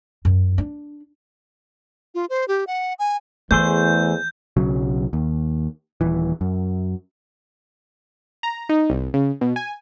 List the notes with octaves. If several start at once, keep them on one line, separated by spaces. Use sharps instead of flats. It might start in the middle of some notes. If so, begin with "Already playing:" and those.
F#2
D4
F4
C5
G4
F#5
G#5
E2 E3 A3 G#4 C5 G6
B1 C#3 F#3
D#2
D#1 E3
F#2
A#5
D#4
C2
C#3
B2
G#5